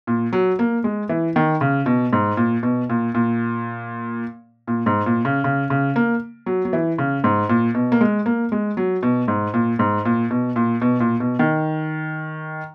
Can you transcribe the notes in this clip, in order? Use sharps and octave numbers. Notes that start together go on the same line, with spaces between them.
A#2
F#3
A#3
G#3
E3
D#3
C#3
B2
G#2
A#2
B2
A#2
A#2
A#2
G#2
A#2
C#3
C#3
C#3
A#3
F#3
F#3
E3
C#3
G#2
A#2
B2
A#3
G#3
A#3
G#3
F#3
B2
G#2
A#2
G#2
A#2
B2
A#2
B2
A#2
B2
D#3